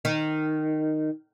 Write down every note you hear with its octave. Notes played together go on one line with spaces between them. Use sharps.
D#3